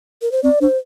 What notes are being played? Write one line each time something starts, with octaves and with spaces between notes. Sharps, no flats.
A#4
C5
C4 D5
D4 C5